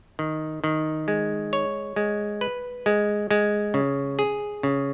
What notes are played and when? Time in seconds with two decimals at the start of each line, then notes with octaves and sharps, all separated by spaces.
0.19 D#3
0.64 D#3
1.08 G#3
1.53 C#5
1.96 G#3
2.41 B4
2.86 G#3
3.31 G#3
3.74 C#3
4.19 G#4
4.63 C#3